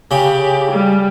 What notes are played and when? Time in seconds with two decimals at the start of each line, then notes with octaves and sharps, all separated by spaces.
0.11 C#3 G4 B5
0.72 G3